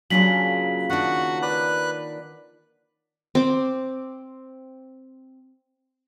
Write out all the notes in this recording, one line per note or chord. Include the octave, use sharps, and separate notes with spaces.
A#2 C#3 F#3 D4 F4 B6 F#7
D#3 D4 F#4 F#5
B4 D5 F#5 F#6
C4 D6